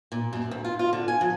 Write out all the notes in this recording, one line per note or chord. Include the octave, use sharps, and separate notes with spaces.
A#2
F#2
D2
F4
F4
D3
G#5
F3